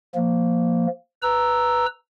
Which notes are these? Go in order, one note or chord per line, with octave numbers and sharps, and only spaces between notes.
F3 A#3
B4 A#5 E6